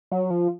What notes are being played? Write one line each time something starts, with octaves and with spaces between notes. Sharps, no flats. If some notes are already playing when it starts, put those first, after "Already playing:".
F#3
F3